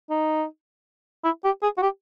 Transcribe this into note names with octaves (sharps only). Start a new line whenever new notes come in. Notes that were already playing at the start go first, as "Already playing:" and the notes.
D#4
E4
G4
G#4
F#4
G4